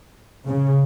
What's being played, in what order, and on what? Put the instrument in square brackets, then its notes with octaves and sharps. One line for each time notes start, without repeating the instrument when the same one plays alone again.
[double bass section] C#3